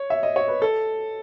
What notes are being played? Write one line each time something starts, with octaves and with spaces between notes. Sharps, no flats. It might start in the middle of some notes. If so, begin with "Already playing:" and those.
Already playing: C#5
E5
D#5
C#5
B4
A4